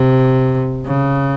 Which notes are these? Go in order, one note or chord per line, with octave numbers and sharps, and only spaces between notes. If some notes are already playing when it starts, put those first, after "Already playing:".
Already playing: C3
C#3